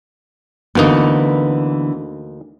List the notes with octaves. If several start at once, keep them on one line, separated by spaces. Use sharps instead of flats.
D2 D3 E3 A#3 B3 D#4